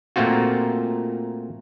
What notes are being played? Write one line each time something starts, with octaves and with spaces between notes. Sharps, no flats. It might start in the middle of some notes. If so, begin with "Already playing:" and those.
A#2 A3 A#3 C4 F4 F#4